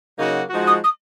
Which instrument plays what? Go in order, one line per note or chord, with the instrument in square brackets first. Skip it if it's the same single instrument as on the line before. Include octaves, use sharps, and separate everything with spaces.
[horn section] C#3 F#3 A#3 D#4 F#4
F3 G#3 D#4 F#4
[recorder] D#6
D#6